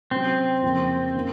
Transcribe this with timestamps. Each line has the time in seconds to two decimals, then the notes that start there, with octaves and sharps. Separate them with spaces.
0.11 C3 F#3 C4 C#4
0.62 F2 C#3 F3 A#3
1.15 D#3 A#3 C#4